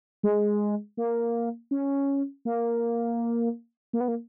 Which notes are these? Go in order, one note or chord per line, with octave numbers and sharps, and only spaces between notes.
G#3
A#3
C#4
A#3
A#3
B3
A#3